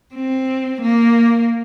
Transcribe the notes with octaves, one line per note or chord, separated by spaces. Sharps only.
C4
A#3